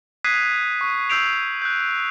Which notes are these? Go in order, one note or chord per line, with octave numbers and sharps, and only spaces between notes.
D#6 F#6 G#6 B6 C7 D#7
C#6
E6 G6 C7 D7 F7
F#6 G6